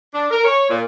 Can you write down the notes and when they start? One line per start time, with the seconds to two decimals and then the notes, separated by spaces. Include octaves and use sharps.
0.14 D4
0.31 A#4
0.45 C#5
0.70 A#2